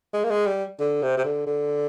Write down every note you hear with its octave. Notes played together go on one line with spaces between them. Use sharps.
G#3
A#3
G#3
G3
D3
C3
C3
D3
D3